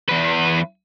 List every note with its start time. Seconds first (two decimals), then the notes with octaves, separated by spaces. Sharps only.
0.09 E2 B4